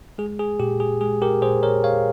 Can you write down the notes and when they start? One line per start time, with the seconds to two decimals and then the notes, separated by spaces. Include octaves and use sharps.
0.18 G#3 G#4
0.39 G#4
0.60 A#2 G4
0.80 G#4
1.01 G#3 G#4
1.22 G4 A#4
1.42 A#2 G#4 C5
1.63 A#4 C#5
1.84 A#2 C#5 F5